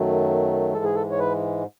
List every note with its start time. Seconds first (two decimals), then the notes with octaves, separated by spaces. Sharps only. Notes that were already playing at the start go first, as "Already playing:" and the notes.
Already playing: F#2 D#3 F#3 A3
0.74 G#2 E3 G#3 A4
0.84 G#4
0.95 A4
1.11 C#5
1.19 B4